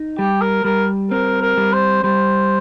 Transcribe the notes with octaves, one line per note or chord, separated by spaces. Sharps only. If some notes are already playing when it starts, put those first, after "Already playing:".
Already playing: D#4
G3 G4
A#4
G3 A#4
C4 A#4
A#4
G3
C5
G3 C5